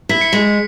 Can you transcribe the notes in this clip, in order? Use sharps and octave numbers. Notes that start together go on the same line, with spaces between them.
E4 B6
C#7
G#3 B6